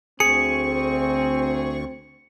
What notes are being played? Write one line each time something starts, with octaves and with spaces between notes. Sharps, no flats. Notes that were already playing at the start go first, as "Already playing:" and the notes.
D2 C4 G#4 C#6 C#7